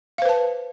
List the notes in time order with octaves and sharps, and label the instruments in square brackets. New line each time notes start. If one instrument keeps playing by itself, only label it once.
[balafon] F5
C5
B4
A5